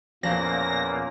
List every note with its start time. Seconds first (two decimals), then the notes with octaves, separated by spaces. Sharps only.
0.23 E2 A#2 F3 A#3 C#4 A#6